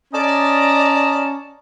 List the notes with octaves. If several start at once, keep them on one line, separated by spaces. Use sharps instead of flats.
C#4 D5 D#5 A5 A#5